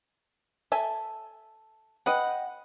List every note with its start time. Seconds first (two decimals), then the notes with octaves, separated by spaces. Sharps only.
0.72 A4 E5 G#5
2.06 B4 D#5 F#5 G5